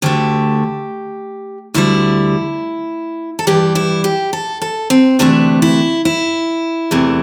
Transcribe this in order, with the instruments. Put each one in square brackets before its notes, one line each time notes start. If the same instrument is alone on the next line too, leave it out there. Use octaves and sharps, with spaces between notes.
[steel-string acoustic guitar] D2 D3 A3 G4
D2 D3 G3 E4
A4
G2 E3 G3 G4
E4
G4
A4
A4
C4
D2 C3 E3 A3 D4
E4
E4
E2 C3 E3 A3